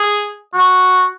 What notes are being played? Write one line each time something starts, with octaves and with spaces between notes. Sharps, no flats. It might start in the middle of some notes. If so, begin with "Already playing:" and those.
Already playing: G#4
F#4